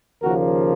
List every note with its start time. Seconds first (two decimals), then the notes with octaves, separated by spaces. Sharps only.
0.23 D#2 C#3 F3 A#3 F#4 A#4